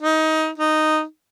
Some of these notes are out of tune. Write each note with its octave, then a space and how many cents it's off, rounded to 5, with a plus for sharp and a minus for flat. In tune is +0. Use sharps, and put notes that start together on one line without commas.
D#4 +20
D#4 -5